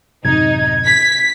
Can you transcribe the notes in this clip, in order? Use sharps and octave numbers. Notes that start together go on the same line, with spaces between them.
A1 F#2 C3 D#4 G#6
B6